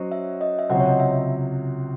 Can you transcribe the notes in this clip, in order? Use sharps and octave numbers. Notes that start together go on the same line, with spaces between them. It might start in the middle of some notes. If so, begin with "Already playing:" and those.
Already playing: F#3 C#4 F#4 C5 D#5
E5
D#5
E5
C#2 C3 F#3 C4 F#5
C#5
D#5
E5